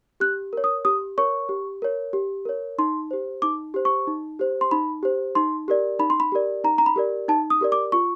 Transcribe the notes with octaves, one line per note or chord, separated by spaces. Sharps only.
G4 F#6
A#4 C#5
D#6
G4 D#6
A#4 C#5 C#6
G4
A#4 C#5
G4
A#4 C#5
D#4 C6
G4 C5
D#4 D6
G4 C5
C#6
D#4
G4 C5
C6
D#4 B5
G4 C5
D#4 C6
G4 A#4 D5
D#4 B5
C6
B5
G4 A#4 D5
D#4 A#5
A#5
B5
G4 A#4 D5
D#4 A5
D#6
G4 A#4 D5
D6
F4 C#6